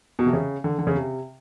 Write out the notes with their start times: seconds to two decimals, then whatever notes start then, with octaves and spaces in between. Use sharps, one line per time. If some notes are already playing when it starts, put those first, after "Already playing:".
0.19 B2
0.26 C3
0.33 C#3
0.64 D3
0.79 D3
0.87 C#3
0.95 C3